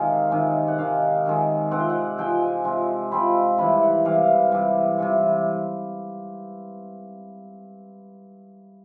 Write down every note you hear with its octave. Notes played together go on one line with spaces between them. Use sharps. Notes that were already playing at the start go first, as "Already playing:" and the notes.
Already playing: C3 D#3 G#3 F5
C3 D#3 G#3
F#5
C3 D#3 G#3 F5
C3 D#3 G#3
C3 F3 G#3 C4 F#5
G5
F#5
C3 F3 G#3 C4 G5
G#5
C3 F3 G#3 C4
C3 F3 G#3 C4 B5
C3 E3 G3 B5
F#5
C3 E3 G3 F5
C3 E3 G3
C3 E3 G3